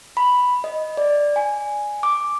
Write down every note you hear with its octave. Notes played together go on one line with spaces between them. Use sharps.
B5
D#5
D5
G#5
D6